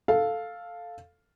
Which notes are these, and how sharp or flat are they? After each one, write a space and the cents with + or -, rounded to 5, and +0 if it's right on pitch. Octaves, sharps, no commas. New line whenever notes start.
A4 +0 F5 +0